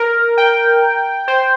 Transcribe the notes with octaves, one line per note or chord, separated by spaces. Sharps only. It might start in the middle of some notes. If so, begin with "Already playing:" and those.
Already playing: A#4
G5
C5